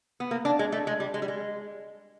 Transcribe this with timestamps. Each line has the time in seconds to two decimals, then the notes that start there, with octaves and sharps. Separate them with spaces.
0.20 B3
0.31 A#3
0.45 D4
0.59 G#3
0.72 A3
0.87 G#3
1.00 G3
1.14 G#3
1.22 G3
1.28 G#3